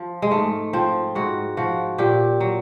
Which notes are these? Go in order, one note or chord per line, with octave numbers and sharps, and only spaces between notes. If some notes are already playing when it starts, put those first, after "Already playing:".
Already playing: F3
G#3
G#2 A3
F3 C4
G#2 F#4
F3 F#4
A#2 G4
F#3